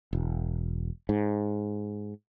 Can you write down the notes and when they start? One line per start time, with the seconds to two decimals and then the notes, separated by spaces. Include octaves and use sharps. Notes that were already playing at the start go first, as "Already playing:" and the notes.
0.13 E1
1.09 G#2